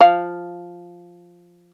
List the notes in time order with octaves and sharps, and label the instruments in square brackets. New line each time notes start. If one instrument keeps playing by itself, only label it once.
[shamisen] F3 F5